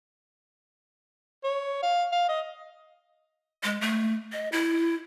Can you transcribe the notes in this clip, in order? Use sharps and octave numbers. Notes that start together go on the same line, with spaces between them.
C#5
F5
F5
D#5
G#3
A3
D#5
E4